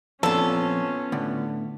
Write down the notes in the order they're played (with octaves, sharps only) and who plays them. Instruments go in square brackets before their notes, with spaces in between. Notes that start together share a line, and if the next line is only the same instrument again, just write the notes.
[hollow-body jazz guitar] F2 A#2 [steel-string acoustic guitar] B3 F4 [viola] C#4 [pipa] A4
[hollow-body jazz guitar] A2 D3